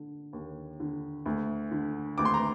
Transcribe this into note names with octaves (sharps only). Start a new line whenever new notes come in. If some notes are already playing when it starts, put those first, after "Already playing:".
Already playing: D3
D#2
D3
D2
D3
D2 D6
C6
A#5